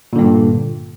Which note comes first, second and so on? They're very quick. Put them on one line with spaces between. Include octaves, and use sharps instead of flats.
A#2 D3 G2